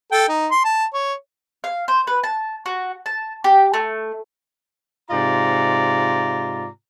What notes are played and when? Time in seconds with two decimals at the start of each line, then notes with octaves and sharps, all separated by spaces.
0.12 A4 G5
0.29 D#4
0.51 C6
0.65 A5
0.94 C#5
1.64 F5
1.88 C5
2.07 B4
2.23 A5
2.66 F#4
3.06 A5
3.44 G4
3.74 A3
5.10 G#2 C3 F4 D5 A#5